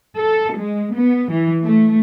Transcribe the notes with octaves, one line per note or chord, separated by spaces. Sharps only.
A4
G#3
B3
E3
A3